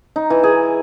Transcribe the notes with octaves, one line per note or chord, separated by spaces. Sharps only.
D#4
E3
G#4